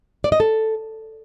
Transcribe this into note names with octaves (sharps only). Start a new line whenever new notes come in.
D5
D#5
A4